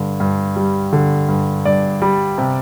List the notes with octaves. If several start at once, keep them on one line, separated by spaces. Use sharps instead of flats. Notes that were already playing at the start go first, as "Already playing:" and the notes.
Already playing: G2 D3
G2
G3
D3
G2
G2 D5
G3
C3